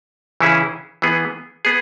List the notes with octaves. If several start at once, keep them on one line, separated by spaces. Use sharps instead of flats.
C#3 E3 C#4 E4 G#4
E3 B3 G#4
B3 G#4